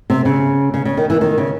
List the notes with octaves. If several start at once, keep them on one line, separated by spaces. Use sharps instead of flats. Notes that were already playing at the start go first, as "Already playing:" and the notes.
C3
C#3
C#3
C#3
D#3
E3
D#3
C#3